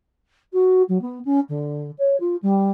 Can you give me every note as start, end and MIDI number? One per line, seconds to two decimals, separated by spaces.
0.53 0.82 66
0.88 1.00 54
1.01 1.19 59
1.24 1.39 61
1.49 1.90 50
1.98 2.16 73
2.20 2.36 65
2.42 2.71 55